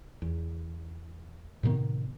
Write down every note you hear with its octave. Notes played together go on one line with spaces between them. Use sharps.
E2
A2 C3 D#3 B3